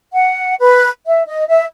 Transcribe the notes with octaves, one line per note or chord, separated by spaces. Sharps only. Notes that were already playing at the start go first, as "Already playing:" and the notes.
F#5
B4
E5
D#5
E5